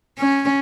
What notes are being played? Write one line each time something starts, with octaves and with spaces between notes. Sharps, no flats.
C#4